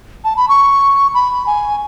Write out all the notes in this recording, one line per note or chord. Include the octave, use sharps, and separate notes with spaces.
A5
B5
C#6
B5
G#5